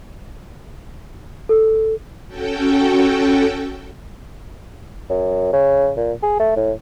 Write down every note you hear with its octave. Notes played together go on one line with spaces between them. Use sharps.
A4
C#4 F#4 A4 G5
F#2
C#3
A#2
G#4
A3
A2